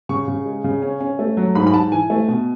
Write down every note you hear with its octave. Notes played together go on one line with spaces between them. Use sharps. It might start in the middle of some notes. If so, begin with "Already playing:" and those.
C#3 C#6
C#3
G#3
C#3
C#4
C#4
A3
F#3
G#2 B5
B5
G#2 A5
E3 G#5
A3
B2